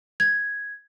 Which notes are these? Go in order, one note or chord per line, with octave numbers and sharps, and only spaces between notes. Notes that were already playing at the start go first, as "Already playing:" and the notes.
G#6